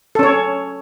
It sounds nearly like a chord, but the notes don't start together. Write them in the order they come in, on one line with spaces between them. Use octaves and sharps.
A4 C#4 C#5